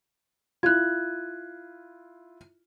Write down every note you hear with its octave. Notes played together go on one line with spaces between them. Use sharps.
E4 F4 F#6 G#6